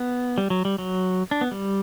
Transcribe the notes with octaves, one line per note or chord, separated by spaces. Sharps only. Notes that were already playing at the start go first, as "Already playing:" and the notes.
Already playing: B3
G3
F#3
G3
F#3
D4
B3
G3